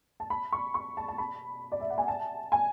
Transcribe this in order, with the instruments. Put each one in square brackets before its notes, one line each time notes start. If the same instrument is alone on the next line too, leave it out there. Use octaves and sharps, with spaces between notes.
[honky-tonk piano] A5
B5
C#6
C#6
A5
A5
B5
D5
E5
F#5
G#5
A5
G#5